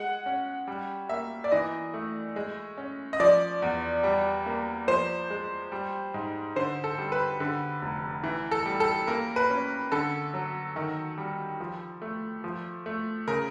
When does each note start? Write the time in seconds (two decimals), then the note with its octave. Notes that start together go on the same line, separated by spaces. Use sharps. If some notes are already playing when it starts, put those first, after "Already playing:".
Already playing: G#3 F#5
0.26 C#4
0.68 G3
1.09 A#3 E5
1.44 D5
1.52 E3 D#5
1.94 A3
2.36 G#3
2.78 C#4
3.13 D#5
3.20 F3 D5
3.62 E2
4.04 G3
4.46 A#3
4.88 F3 C5
5.30 G#3
5.72 G3
6.14 G#2
6.56 D3 C5
6.84 A4
6.98 G3
7.12 B4
7.40 D3
7.82 F1
8.24 E3
8.51 A4
8.66 G3
8.80 A4
9.07 A#3 A#4
9.36 B4
9.50 C#4
9.92 D3 A4
10.34 F#3
10.76 D#3
11.18 G3
11.60 F3
12.02 A3
12.44 F3
12.86 A3
13.28 C#3 A#4